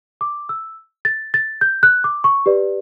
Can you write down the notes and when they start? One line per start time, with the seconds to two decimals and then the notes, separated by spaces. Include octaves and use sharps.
0.21 D6
0.49 E6
1.05 A6
1.34 A6
1.61 G6
1.83 F#6
2.04 D6
2.24 C#6
2.46 G4 B4 D5